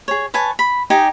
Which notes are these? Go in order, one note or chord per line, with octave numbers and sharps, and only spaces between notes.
G#4 C#5
B4 C#5 G#5 A5
B5
D#4 G4 D#5 G#5